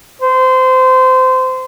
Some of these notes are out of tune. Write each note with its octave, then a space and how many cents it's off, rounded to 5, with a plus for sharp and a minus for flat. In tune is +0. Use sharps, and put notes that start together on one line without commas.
C5 -25